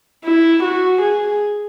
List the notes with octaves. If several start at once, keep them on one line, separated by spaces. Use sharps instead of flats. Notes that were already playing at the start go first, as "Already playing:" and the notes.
E4
F#4
G#4